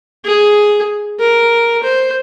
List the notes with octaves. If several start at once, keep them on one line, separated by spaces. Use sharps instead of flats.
G#4
A#4
C5